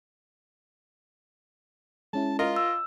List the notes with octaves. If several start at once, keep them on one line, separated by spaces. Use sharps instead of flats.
G#3 C#4 E4 A5
F4 A#4 D#5
E6